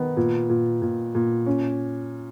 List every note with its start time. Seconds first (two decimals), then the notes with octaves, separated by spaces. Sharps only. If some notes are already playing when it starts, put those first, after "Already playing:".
Already playing: D#3 B3
0.17 A#2
0.49 A#2
0.82 A#2
1.15 A#2
1.46 C#4